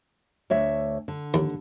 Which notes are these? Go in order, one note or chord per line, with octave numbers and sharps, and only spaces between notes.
D2 C#5 E5
D3
D#2